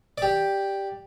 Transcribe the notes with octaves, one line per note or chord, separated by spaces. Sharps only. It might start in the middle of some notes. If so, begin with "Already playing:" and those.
G4 D5